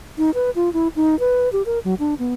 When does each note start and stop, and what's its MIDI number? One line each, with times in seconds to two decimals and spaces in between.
0.18 0.31 63
0.34 0.50 71
0.55 0.72 65
0.73 0.88 64
0.96 1.18 63
1.20 1.51 71
1.53 1.62 67
1.66 1.79 70
1.84 1.95 54
1.99 2.14 62
2.19 2.34 59